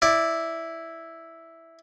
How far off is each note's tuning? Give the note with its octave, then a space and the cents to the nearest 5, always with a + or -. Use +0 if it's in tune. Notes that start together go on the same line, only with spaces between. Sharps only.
E4 +0 D5 +0